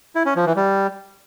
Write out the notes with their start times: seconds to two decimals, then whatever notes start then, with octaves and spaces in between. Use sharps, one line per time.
0.15 E4
0.26 C#4
0.36 F3
0.46 E3
0.56 G3